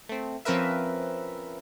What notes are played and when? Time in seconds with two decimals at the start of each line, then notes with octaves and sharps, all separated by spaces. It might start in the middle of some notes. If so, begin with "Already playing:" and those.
0.09 A3 C4
0.45 F3 C4 C#4 A#4 B4 E5